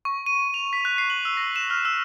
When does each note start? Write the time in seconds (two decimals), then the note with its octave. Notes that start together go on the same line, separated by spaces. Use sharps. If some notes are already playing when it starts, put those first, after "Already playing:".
0.05 C#6
0.26 D#7
0.54 F7
0.73 B6
0.85 F#6
0.98 C7
1.10 F#7
1.25 E6
1.37 A#6
1.56 E7
1.70 F6
1.85 E6